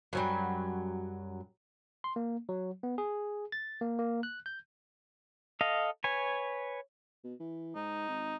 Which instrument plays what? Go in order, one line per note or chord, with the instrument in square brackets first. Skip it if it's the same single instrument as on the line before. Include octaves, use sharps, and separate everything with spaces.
[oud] F#2 F#3 G3
[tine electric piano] C6
A#3
F#3
B3
G#4
A6
A#3
A#3
F#6
G6
[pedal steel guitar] A4 D#5 F5
B4 C#5 G#5
[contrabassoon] B2
E3
[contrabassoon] G#2 [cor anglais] D#4
[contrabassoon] G#1